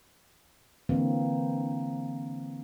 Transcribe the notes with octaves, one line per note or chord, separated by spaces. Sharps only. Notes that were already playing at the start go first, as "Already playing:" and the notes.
D3 E3 A#3 C4